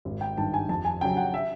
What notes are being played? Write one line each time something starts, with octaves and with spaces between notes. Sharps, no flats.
G#1
G5
G2 D#3 A5
G#5
F2 A5
G#5
C#3 F#3 G5
F#5
E5